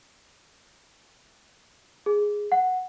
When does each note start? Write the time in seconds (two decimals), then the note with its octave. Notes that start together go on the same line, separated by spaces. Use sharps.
2.06 G#4
2.52 F#5